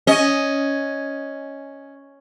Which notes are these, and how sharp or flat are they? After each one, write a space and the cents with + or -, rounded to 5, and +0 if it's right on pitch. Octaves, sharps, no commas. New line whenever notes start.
C#4 +0 D#5 +0